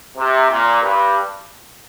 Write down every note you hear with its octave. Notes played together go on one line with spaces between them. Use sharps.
C3
A#2
G2